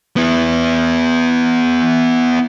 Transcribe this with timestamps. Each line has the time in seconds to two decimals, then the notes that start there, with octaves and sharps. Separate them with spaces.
0.16 B3 E4